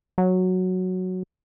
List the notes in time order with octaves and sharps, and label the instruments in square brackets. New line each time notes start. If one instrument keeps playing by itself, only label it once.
[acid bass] F#3